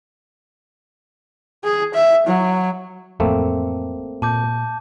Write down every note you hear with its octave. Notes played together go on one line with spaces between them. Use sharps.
G#4
E5
F#3
A1 F2 A3 A#3 C4
A#2 A5 D6 G6